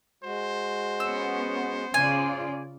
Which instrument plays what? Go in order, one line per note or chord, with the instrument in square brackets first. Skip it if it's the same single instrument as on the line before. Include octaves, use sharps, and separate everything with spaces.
[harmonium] G#3 F#4 [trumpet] C5
[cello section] B3 C#4 [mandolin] E6
[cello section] C#3 F4 D5 [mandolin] G#5